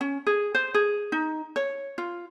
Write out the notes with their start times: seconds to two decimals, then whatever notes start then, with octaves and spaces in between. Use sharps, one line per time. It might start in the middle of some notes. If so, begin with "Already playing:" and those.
0.01 C#4
0.27 G#4
0.55 C5
0.74 G#4
1.12 D#4
1.56 C#5
1.98 F4